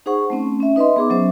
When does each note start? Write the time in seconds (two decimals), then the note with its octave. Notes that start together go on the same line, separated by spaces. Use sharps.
0.06 D#4 G#4 C5 F#5 C#6
0.30 A3 C4 C#4
0.60 C#4 E5
0.76 D#4 B4 D#5 E5 C6
0.96 B3 G#4 D6
1.10 F#3 C#4 C5 E5